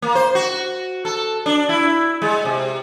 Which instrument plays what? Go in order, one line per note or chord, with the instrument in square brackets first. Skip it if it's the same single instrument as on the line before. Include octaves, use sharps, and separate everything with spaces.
[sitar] A#3
C5
F#4
A4
D4
E4
G#3
C3